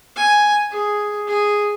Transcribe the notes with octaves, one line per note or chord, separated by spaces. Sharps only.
G#5
G#4
G#4